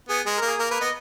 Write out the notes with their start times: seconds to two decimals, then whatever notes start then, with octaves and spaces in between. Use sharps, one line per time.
0.09 B3 G#4
0.26 G#3 G#4
0.37 A#3 A#4
0.47 G#4
0.59 A#3 A#4
0.70 A#3 B4
0.81 B3 D#5